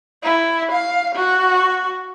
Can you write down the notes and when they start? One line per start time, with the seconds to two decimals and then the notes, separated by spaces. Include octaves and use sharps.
0.23 E4
0.72 F5
1.15 F#4